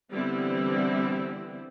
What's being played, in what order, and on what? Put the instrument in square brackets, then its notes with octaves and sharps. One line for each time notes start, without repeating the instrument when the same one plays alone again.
[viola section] D3 E3 G3 B3 C4 E4